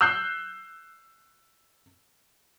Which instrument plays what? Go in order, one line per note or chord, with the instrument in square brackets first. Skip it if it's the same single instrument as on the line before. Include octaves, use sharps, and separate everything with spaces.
[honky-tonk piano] E6 F#6 G6 C7